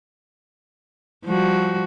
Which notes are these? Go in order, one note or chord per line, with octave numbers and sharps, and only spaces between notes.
F3 G3 F#4